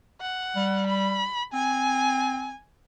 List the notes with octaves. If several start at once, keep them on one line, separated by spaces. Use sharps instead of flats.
F#5
G3
B5
C4 G#5